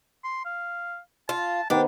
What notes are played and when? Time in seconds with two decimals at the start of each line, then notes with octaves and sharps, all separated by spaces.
0.24 C6
0.45 F5
1.29 F4 A5
1.70 D#3 B3 D4 G4 C5